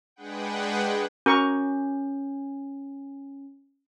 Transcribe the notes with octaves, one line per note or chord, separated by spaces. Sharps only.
G#3 D4 G#4 B4 F#5 G5
C#4 F#4 A#4 C#6